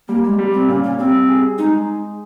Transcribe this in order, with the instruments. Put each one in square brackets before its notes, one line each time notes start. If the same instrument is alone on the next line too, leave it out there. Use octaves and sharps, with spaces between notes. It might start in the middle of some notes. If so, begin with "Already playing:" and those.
[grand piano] G3 [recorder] A#3
[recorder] G#3
[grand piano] G3
[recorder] C4
[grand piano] A#2 [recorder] C#4
[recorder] C#4
[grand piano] G3 [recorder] C4
[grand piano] G#4
[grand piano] G#3 [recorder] D#4